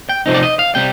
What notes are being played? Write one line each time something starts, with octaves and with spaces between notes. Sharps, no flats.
G5
C3 F3 C4 D#4
D5
D#5
F5
C3 G3 G5